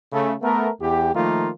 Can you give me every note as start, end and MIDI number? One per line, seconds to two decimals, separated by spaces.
0.13 0.34 49
0.13 0.34 57
0.42 0.69 57
0.42 0.69 59
0.42 0.69 70
0.81 1.14 40
0.81 1.14 67
1.15 1.49 51
1.15 1.49 53
1.15 1.49 57
1.15 1.49 58
1.15 1.49 63
1.15 1.49 65